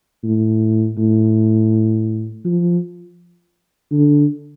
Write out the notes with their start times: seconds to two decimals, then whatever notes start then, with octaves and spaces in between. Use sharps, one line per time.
0.23 A2
0.98 A2
2.45 F3
3.92 D3